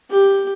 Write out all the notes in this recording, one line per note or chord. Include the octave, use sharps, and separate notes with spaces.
G4